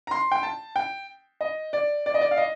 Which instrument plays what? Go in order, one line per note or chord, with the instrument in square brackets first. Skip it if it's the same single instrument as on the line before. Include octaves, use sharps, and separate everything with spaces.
[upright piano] A#5
C6
G5
A5
G5
D#5
D5
D5
D#5
D5
F5
D#5